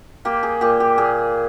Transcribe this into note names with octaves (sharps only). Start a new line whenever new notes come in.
A#3 G4
G#4
A#2 G4
G4
A#2 G#4